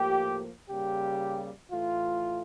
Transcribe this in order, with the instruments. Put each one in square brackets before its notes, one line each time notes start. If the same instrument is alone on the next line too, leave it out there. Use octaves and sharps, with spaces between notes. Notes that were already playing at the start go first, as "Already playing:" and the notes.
Already playing: [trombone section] A2 F3 A#3 G4
C#3 G3 A#3 G4
A2 E3 A3 F4